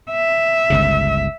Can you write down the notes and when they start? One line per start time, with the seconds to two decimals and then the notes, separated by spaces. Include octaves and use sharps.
0.12 E5
0.70 G1 C#2 C#3